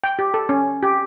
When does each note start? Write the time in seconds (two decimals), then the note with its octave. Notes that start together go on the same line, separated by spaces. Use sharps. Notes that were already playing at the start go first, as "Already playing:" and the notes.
0.04 G5
0.19 G4
0.34 A4
0.49 C#4
0.83 G4